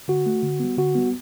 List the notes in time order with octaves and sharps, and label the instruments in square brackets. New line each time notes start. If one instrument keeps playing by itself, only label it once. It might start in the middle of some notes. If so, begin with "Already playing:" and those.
[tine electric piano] D3 F#4
A3
D3
G3 B3
D3 F#4
G3 B3